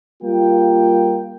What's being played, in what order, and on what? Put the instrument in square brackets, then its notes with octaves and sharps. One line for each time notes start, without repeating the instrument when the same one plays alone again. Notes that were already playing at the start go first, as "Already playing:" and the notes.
[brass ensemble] G3 A#3 F4 G5